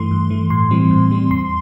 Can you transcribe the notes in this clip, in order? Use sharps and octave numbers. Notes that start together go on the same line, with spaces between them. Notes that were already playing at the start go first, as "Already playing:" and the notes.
Already playing: G2 E3 A3 C6
G2
E3 A3
A2 C6
E3 G3 C4
A2
E3 G3 C4
E2 C6